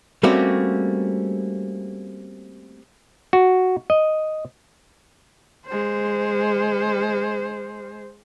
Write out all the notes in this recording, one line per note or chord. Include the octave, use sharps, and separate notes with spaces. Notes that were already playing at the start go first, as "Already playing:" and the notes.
G3 A3 A#3 C4 C#4 F#4
F#4
D#5
G#3 C5